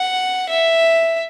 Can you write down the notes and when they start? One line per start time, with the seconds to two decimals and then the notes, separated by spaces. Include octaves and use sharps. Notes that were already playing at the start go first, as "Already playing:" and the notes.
Already playing: F#5
0.49 E5